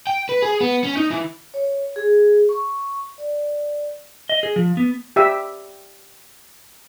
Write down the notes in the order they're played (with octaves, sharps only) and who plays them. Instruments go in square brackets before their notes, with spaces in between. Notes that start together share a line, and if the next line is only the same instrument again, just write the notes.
[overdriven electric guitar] G5
B4
G#4
B3
C#4
D#4
E3
[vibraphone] C#5
G#4
C#6
D5
[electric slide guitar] D#5
G#4
F3
B3
[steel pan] G4 E5